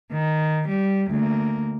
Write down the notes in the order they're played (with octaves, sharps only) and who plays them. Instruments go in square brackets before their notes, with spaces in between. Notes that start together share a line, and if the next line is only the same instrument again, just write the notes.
[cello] D#3
G3
D2 A#3